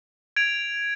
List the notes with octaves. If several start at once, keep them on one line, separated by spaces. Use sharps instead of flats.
G#6 D7 F7